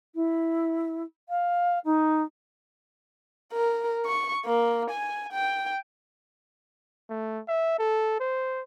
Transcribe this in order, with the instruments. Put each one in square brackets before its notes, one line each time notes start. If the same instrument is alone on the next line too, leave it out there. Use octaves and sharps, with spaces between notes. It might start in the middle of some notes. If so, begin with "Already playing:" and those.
[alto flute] E4
F5
D#4
[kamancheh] A#4
C#6
A#3
G#5
G5
[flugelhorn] A3
E5
A4
C5